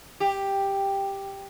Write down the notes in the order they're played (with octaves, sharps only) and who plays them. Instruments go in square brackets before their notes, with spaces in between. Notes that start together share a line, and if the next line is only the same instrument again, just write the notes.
[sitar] G4